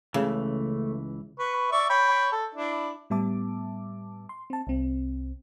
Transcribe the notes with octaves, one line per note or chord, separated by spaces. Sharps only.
C#2 C#3 E3 A3
B4 C#6
D5 E5 C#6
C#5 G5 B5
A4
D4 E4
A2 G3 B3 E5 A5 D6
C6
C4 A5
C2 C4